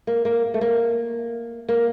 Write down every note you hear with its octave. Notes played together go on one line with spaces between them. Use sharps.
A#3
A#3
A3
A#3
A#3